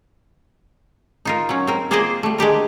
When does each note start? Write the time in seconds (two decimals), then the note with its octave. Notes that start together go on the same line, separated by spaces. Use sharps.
1.25 D#4 F4 A#4
1.49 F#3 C#4
1.67 C4 A#4
1.91 A#3 F4 G#4 C5 D5 D#5
2.23 G3 A3
2.38 G#3 D4 G4 A#4